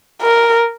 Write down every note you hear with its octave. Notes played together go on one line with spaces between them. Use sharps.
A#4